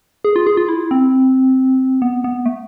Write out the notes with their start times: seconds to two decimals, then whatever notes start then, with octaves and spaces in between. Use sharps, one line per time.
0.25 G#4
0.36 F4
0.47 G#4
0.57 F4
0.69 E4
0.91 C4
2.02 B3
2.24 B3
2.46 A3